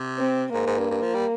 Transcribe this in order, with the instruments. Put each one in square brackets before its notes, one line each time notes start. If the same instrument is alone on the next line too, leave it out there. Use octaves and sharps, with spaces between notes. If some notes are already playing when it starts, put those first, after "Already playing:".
Already playing: [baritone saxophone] C3
[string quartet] C4
[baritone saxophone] G#2 [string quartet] A#3
[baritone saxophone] G#2
G2
G2
F3
G3